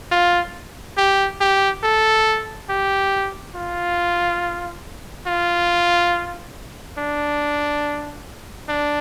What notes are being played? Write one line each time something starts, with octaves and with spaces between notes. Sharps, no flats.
F4
G4
G4
A4
G4
F4
F4
D4
D4